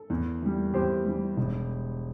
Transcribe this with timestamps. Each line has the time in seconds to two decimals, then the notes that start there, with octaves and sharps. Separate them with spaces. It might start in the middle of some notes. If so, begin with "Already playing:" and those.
Already playing: A4
0.10 E2
0.42 E3 G3
0.74 E2 G4 C5
1.05 E3 G3
1.37 E1